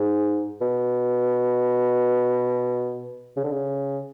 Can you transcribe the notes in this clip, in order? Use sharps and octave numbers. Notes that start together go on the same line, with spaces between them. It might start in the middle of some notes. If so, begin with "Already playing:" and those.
Already playing: G#2
B2
C#3
D3
C#3